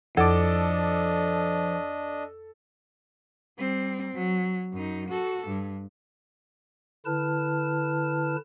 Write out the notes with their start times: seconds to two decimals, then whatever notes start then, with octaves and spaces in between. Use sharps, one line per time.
0.17 F2 F3 D4 A4 D#5 D6 A6
3.59 G3 C4
4.15 F#3
4.73 F#2 D#4
5.09 F#4 A4
5.48 G2
7.05 D3 E4 B4 A5 F6